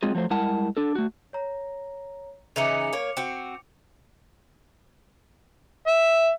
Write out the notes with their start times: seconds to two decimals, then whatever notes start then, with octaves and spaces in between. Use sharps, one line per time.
0.03 F#3 G#3 C4 F4 G#4
0.15 F3 F#3 A3 C5
0.30 G3 G#3 E4 A#4 F#5 A5
0.77 D4 A4
0.95 A3 F#4
1.33 C#5 A#5
2.56 C#3 E3 D#4 D6 C#7 F7
2.93 A#3 C#5
3.17 C4 F#4
5.87 E5